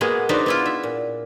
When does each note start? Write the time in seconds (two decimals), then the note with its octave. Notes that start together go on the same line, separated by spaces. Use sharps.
0.01 G#3 A#3 B3 F#4 G#4
0.29 D4 D#4 F#4 B4 C5 D5
0.46 B3 E4 F4
0.66 E5
0.83 A#2